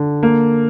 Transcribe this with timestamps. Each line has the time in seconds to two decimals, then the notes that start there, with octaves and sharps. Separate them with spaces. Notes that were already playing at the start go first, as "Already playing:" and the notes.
Already playing: D3
0.23 A#3